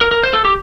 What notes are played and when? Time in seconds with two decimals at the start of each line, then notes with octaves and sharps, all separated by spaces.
0.01 A#4
0.11 A#4
0.24 C5
0.33 A4
0.45 G4